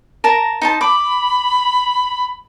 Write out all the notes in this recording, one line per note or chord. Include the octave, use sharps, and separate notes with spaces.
A#4 A5 A#5
D#4 C5 A5
B5 D6